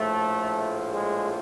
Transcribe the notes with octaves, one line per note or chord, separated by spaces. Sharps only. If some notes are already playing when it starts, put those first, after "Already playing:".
Already playing: A#1 A2 F3 A3
G#3